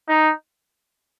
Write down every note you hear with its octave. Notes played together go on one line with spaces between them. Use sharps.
D#4